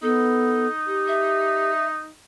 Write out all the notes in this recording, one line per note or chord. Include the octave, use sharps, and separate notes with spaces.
B3 D#4 A4
G4
E5